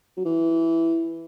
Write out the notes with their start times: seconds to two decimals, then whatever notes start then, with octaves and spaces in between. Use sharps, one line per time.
0.17 F#3
0.25 E3